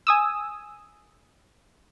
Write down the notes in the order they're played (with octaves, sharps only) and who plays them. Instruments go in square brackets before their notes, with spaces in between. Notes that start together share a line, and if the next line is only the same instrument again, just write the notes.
[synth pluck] G#5 D#6 E6